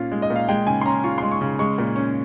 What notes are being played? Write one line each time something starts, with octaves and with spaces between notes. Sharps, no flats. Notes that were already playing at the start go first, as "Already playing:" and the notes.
Already playing: A#2 C#4 F4
G#3
D#5
A#2
F5
G#3 G5
C#3 G#5
C6
C#4 A#5
F4 C#6
G#3 C6
C#6
C#3
G#3 C#6
A#2
C#4